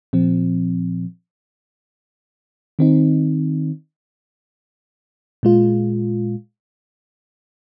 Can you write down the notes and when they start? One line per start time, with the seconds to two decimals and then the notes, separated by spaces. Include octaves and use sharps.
0.13 A#2 F3 C4
2.79 D#3 C4 D#4
5.43 A#2 G#3 F4